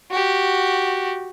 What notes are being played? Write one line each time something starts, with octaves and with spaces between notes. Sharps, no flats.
F#4 G4